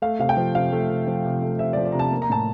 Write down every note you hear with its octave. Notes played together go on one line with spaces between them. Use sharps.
A3 F5
C3 F5
G5
F3
C3 F5
A3
C3
F3
C3
A3
C3 E5
D5
F3
D5
C3 A#5
A5
A#3
A#5
A2 A5